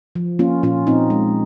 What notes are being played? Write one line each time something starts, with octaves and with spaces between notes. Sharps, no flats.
F3
A#3 C#4 F4
A#2 C#4 F4
A#2 C4 D#4
G#3